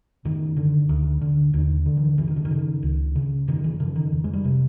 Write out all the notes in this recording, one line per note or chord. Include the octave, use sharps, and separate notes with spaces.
F#2 D#3
D3
D2
D3
D#2 D3
D3
E3
F#2 E3
D#3
D3
D#3
C#3
C#2
C#3
F#2 D#3
E3
C#3 F3
D#3
F2
G#3
G3
C3